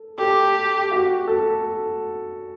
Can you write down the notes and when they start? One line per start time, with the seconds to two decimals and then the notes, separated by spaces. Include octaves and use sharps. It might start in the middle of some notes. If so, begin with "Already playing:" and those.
Already playing: A4
0.18 G4 A4
0.91 F#4
1.27 A4